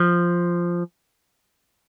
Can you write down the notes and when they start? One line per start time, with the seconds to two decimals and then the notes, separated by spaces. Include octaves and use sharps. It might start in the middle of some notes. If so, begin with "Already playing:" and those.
Already playing: F3